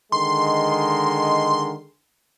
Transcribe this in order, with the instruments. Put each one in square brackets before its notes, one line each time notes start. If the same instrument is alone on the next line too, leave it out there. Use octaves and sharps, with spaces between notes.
[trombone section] D3 D#3 G#3 [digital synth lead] C6